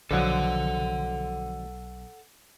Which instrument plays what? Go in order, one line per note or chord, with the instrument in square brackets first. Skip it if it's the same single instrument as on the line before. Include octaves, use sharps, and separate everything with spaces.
[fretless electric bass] B1 [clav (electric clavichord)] D3 F3 F#3 [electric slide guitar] A4 F#5